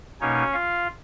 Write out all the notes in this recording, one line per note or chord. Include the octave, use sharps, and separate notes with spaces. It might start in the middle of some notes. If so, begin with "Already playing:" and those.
B2 A#3 C#4 D#4 C#5
F4 F5